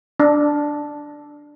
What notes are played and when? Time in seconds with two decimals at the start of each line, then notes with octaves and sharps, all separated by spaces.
0.20 D4